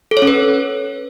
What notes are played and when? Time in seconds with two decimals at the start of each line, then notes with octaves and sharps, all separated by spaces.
0.11 A4
0.17 C#5
0.22 C#4
0.27 B4